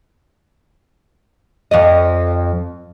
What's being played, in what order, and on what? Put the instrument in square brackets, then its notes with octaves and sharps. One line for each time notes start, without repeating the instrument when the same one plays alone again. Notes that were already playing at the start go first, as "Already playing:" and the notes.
[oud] F2 D5 D#5